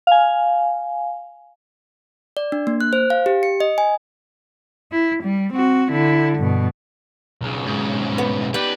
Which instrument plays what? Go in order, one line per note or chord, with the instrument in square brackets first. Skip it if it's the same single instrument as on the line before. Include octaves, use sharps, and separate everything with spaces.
[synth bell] F5 G#5
[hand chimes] D5
D4
A#3
F#6
C5
F5
G4
C#7
D#5
G#5
[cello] E4
G3
C4 F#4
D3 E4
G2 B2
[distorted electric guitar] B1 C#3
[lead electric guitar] G#2
[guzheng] B3
[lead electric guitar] D#4 D5 [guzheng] G4 [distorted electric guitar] B4